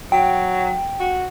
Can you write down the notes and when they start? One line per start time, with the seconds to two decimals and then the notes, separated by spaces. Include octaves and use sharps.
0.12 F#3 G5
1.00 F#4